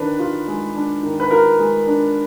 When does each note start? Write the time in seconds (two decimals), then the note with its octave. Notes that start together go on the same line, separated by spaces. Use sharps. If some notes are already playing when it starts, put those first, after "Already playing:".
Already playing: D#3 D4 B4
0.19 F4
0.47 G#3
0.76 D4
1.03 D#3
1.20 B4
1.31 F4 A#4
1.59 G#3
1.87 D4